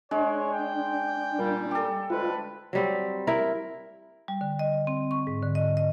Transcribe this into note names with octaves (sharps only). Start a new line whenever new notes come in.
G#3 D4 C#5
G5
A#2 G3
G4 A4
D2 G#3 F4 B4
F#3 G3 C4
E4 A#4
G3
D3
D#5
C4
C#6
G#2
D3
D#5
D#5